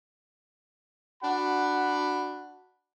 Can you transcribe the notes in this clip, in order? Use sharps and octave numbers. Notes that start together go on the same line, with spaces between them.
D4 F#4 F#5 B5